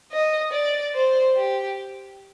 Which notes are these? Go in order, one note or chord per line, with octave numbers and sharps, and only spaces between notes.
D#5
D5
C5
G4